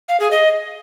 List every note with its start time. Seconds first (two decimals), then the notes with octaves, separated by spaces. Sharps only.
0.09 F5
0.20 G#4
0.31 D#5